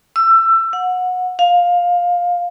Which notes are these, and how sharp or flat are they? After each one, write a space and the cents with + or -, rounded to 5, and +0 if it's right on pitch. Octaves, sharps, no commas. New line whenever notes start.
E6 +25
F#5 -20
F5 +15